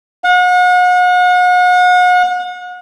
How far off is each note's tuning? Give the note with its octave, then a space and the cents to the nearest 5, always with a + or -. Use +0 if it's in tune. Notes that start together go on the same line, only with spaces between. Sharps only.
F#5 -40